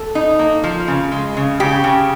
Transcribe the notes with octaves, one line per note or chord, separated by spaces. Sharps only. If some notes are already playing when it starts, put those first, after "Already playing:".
Already playing: A4
D#4
A#3
F3
C#3
G#3
C#3
C#3 G4
C#3